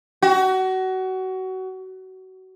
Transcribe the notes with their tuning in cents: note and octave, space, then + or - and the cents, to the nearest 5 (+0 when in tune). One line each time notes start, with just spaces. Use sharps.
F#4 +25